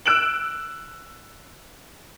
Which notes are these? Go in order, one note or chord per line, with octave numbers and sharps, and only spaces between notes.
E6 F#6 D7 E7 F#7